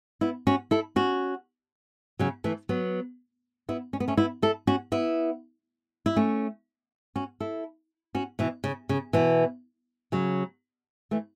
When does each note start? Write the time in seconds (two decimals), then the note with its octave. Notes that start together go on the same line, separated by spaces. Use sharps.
0.21 B3 E4
0.47 C#4 F#4
0.71 E4 A4
0.96 C#4 F#4
2.19 C#3 F#3
2.44 E3 A3
2.69 F#3 B3
3.69 B3 E4
3.93 C#4
4.00 B3
4.08 A3 C#4
4.17 B3 E4
4.42 E4 A4
4.67 C#4 F#4
4.92 B3 E4
6.06 E4
6.16 A3 C#4
7.16 C#4 F#4
7.40 E4 A4
8.15 C#4 F#4
8.39 B2 E3
8.64 C#3
8.89 C#3
9.13 B2 E3
10.12 C#3 F#3
11.11 E3 A3